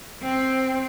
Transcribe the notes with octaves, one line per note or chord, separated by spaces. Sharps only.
C4